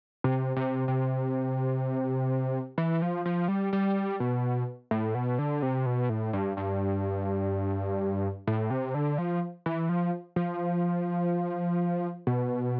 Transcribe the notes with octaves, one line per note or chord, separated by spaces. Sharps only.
C3
C3
C3
E3
F3
F3
G3
G3
B2
A2
B2
D3
C3
B2
A2
G2
G2
A2
C3
D3
F3
E3
F3
F3
B2